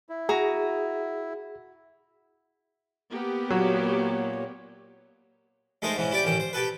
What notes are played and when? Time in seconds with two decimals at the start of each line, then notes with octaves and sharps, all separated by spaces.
0.09 E4
0.29 F#4 G#4 A#5 D#6
3.10 A#3 B3 G4
3.50 A#2 F#3 C#5
5.82 G#3 A3 D#4 A#4 C5
5.96 G#2 E3 C#4
6.11 E4 G4 D5 G5
6.24 A1 D#3 C#4 G5
6.40 C5
6.53 G4 A4 B4